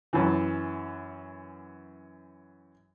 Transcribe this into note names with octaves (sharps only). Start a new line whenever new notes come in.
F#2 E3